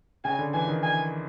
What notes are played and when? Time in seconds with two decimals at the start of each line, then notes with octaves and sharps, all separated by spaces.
0.24 C#3 G#5
0.39 D3
0.54 E3 G#5
0.68 D#3
0.83 G#5